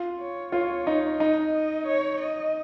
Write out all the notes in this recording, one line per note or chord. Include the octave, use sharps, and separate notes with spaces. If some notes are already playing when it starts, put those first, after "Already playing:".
Already playing: F4
C#5
F4 C#5
D#4
D#4 D#5
D#5
C#5
D#5